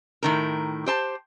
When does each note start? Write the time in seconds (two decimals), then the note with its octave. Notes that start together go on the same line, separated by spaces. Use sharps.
0.23 A2 D#3 A#4
0.86 G4 C5 A5